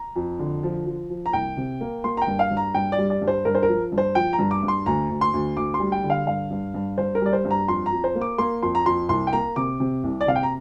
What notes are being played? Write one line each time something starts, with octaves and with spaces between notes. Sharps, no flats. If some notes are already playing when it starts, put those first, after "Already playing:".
Already playing: A#5
F2
D3
F3
F3
F3
A#5
C2 G5
C3
A#3
A#3 C6
A#5
G5
G2
F5
G2
A#5
G2 G5
D5
G3
D5
G2
C5
G2 A#4
C5
A#4
F3
G2
C5
F3 G5
A#5
G2
D6
G2
C6
D2 A#5
D2
C6
D2
D2 D6
C6
G3
G5
D3
F5
G2 F5
G2
G2
G2 C5
A#4
G3 D5
C5
G2
A#5
F2 C6
A#5
F2
C5
A#3
D6
A#3 C6
F2 C6
A#5
F2 C6
C2 C6
G5
A#3 A#5
C3 D6
C3
C2
D5
C3 F5
G5
A#5